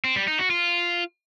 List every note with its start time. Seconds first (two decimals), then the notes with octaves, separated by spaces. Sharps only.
0.05 C4
0.16 G3
0.27 D#4
0.39 F#4
0.50 F4